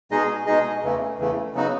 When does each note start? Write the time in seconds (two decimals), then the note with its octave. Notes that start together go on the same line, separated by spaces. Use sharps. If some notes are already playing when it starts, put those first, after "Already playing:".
0.11 B2 G#3 D#4 G#4 D#5
0.47 B2 G#3 D#4 G#4 D#5
0.83 E2 C#3 E3 A3
1.19 E2 C#3 E3 A3
1.54 C#3 F#3 B3 D#4 F#4